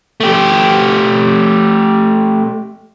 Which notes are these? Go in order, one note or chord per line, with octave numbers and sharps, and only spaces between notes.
A3 G4